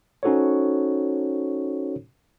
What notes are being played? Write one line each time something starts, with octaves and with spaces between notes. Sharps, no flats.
C#4 D#4 F#4 A4 C5 C#5